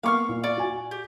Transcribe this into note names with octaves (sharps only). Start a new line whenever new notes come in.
A#3 B3 F5 C#6 D6 F6
A#2
D5 C#6
F#4 G#5
G4